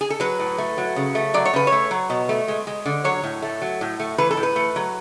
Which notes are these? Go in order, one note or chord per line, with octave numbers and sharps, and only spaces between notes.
G#4
A4
F#3 B4
A2
A3
F#3
C#3
A3
F#3 D5
C#5
C#3 B4
C#5
A3
F#3
B2
A3
G#3
G#3
D3
F#3 C#5
A2
A3
F#3
A2
A3
E3 B4
A4
A2
B4
A3
F#3